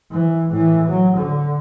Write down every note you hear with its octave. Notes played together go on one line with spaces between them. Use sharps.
E3
A2 E3
F#3
D3